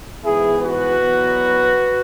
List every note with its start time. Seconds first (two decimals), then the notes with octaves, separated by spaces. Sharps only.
0.24 G#2 E3 B3 E4 G#4
0.62 F#4 B4
1.00 E2 B2 F#3 B3